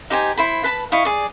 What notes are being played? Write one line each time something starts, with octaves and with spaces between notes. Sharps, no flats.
D#4 G4 C5 G#5
E4 C5 B5
B4 A5 B5
E4 D#5 F5 C#6
G#4 D5